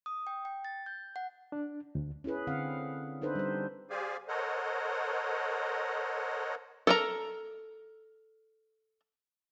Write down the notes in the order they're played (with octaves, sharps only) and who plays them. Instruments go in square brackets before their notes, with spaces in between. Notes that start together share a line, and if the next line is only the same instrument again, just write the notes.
[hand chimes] D#6
G5
G5
A6
G6
F#5
[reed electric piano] D4
D2
[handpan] C#4 E4 G#4 B4
D3 C4 F5 F#5
D4 D#4 A4 B4 C5
G3 C5
[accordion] G4 G#4 C5 D5 F5 G#5
A4 A#4 C5 C#5 D#5 F#5
[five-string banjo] A4 A#4 A#5